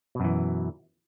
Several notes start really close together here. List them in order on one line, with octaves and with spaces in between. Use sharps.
B2 F#2 E3